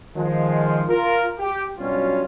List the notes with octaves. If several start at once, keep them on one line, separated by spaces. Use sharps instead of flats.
D#3 F3 G#3
F4 A#4
G4
G2 B2 F#3 G3 C#4 F4